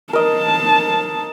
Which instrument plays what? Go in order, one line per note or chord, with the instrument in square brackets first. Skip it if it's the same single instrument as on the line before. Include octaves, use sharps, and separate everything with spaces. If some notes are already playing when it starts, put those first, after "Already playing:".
[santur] A#4 D#5 [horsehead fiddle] A5